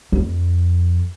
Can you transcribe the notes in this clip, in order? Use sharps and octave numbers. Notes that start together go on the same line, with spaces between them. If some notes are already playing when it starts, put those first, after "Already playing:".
F2